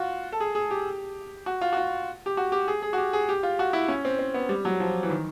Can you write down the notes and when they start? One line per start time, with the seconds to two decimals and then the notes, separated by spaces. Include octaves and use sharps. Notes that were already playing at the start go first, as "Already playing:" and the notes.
Already playing: F4 F#4
0.32 A4
0.40 G#4
0.55 G#4
0.71 G4
1.46 F#4
1.61 F4
1.73 F#4
1.77 F4
2.26 G4
2.37 F#4
2.52 G4
2.68 G#4
2.82 G#4
2.93 F#4
2.98 G4
3.13 G#4
3.29 G4
3.43 F4
3.59 F#4
3.73 E4
3.88 C#4
4.05 C4
4.19 C4
4.34 B3
4.49 G3
4.65 F#3
4.80 F3
5.03 E3
5.10 D#3